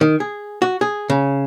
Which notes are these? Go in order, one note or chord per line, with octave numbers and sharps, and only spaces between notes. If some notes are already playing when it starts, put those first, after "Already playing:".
D#3
G#4
F#4
G#4
C#3